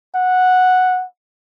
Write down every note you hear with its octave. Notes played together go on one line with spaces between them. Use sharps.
F#5